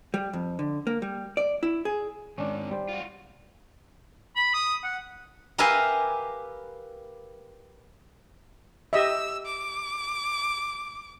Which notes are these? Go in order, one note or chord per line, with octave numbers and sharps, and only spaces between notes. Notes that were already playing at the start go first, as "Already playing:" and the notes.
G3
F2
D3
A#3
G3
D5
E4
G#4
G#2 D#3 C#4 D4
G3 C5
F4 F#4
B5
D#6
F#5
G4 A#4 B4 E5 F5 G#5
G4 D#5 E5 E6
D6